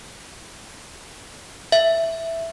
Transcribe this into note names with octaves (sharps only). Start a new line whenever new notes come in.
E5